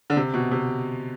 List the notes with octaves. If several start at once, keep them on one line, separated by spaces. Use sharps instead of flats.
D3
C3
B2
C3